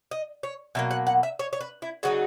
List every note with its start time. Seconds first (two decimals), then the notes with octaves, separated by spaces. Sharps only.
0.11 D#5
0.43 C#5
0.75 B2 F#3 A#3 E5
0.91 F#5
1.07 F#5
1.23 E5
1.39 C#5
1.53 C#5
1.61 B4
1.82 E4
2.03 C#3 F#3 B3 D#4 F#4